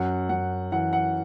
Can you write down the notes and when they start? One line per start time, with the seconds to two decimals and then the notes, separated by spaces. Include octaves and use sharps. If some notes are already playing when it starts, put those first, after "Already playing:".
Already playing: F#2 F#5
0.29 F#2 F#5
0.72 E3 F#5
0.93 F#5